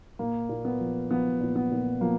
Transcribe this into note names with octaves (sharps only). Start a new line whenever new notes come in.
A#2 A#3
A#2
B3
F3
F3 B3
A#2
B3
A#2
F3 A#3